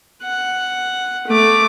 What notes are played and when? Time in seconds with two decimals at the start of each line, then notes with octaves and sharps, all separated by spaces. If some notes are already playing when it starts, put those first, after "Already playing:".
0.23 F#5
1.28 A3 D6